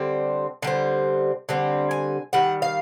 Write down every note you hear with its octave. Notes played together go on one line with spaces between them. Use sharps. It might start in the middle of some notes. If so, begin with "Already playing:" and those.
Already playing: D3 G3 C4
D3 G3 C4
D3 G3 C4
G#5
D#3 G3 F#5
F5